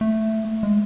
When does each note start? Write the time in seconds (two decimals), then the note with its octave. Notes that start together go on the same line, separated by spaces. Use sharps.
0.01 A3
0.63 G#3